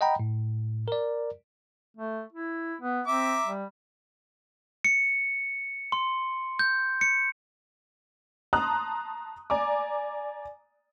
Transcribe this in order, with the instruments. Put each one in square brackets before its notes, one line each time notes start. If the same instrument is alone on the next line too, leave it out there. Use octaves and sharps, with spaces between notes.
[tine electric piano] D#5 F#5 G5 A#5 B5
A2
A#4 D5
[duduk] A3
E4
B3
[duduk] C4 [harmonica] E5 A#5 D6
[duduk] G3
[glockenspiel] C#7
C6
G6
C#7
[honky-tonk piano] A5 A#5 C6 D#6 F#6
D5 G#5 A#5 D6